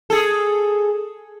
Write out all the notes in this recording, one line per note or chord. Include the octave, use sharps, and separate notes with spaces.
G#4 A4